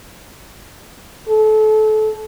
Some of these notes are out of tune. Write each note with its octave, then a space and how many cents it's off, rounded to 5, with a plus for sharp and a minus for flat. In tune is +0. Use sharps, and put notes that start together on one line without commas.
A4 -25